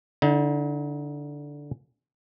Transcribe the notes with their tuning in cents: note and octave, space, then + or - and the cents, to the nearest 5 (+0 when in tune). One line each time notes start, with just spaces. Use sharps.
D3 -10 D#4 +45